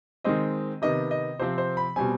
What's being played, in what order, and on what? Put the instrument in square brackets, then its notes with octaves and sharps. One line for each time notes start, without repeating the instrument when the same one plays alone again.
[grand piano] D#3 G#3 C4 D#5
C3 D#3 B3 D#5
D#5
C3 F3 C4 C5
C5
B5
B2 G3 C4 G#5